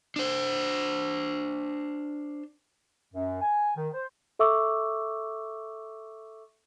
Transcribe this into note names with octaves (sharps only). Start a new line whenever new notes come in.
D4 C5
F#2
G#5
D#3
C5
A4 E5 C#6 D6 E6